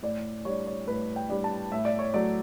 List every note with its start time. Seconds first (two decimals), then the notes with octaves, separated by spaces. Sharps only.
0.03 A2 D5
0.45 G3 D4 C#5
0.66 C#5
0.88 A2 B4
1.16 G5
1.29 G3 D4
1.44 A5
1.72 A2 E5
1.85 D5
1.99 C#5
2.14 F#3 A3 D5